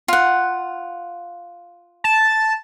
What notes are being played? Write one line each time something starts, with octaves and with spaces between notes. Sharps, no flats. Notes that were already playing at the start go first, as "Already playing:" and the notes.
F4 F#5
A5